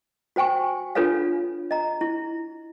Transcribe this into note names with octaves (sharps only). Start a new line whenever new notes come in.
F#4 C5 G5 G#5 C#6
D4 F4 A4 B4 C#5 F5
D#5 A#5
E4